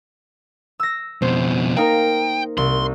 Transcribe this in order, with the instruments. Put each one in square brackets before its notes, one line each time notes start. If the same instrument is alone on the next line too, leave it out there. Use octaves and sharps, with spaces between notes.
[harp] E6 A#6
[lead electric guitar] F2 B2 [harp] C5
[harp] A#3 D#4 A#4 [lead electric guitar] G5
[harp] C2 [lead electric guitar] C6